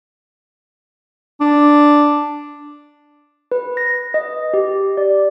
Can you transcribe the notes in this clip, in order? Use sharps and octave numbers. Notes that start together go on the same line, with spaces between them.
D4
B4
A#6
D#5
G4
D5